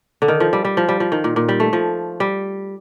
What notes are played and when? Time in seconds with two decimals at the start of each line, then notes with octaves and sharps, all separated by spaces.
0.22 D3
0.28 D#3
0.40 F3
0.53 G3
0.65 G3
0.77 F3
0.88 G3
1.00 F3
1.12 D#3
1.24 A#2
1.36 A#2
1.49 G3
1.60 A3
1.73 F3
2.20 G3